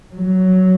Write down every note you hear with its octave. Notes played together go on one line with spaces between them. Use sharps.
F#3